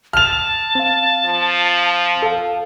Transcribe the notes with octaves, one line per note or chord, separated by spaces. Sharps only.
A5 F6 F7
C4 F5
F3
A4 F5